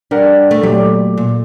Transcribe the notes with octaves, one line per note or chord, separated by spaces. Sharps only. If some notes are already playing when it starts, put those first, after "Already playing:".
G3 D4 A#4 F#5
A3
A#2 F#3 A3 G4 D5
A#2